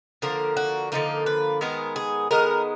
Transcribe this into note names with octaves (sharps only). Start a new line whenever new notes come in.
D3 F3 A#3 A#4
F#4
D3 F3 A#3 D#4
B4
D#3 G#3 B3 A#4
G#4
D#3 G#3 B3 A#4